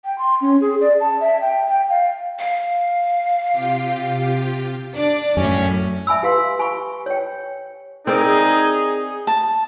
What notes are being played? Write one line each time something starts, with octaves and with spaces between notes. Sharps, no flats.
G5
C6
C#4
G#4
D5
A5
E5
G5
G5
F5
F5
C3 F4 G4
D4 D5
F#2 A2 C#4
E5 G#5 B5 E6
G4 B4 F5 C6
G4 G#5 B5 C#6
C#5 G5
C4 D#4 G#4 A#4 D5
A5